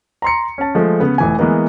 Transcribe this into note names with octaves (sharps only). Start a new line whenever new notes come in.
A#5 C6 C#7
C#4 A5
F3 G#3 A3
C#3 B3
F1 E3 G#5
E3 G#3 A#3 B3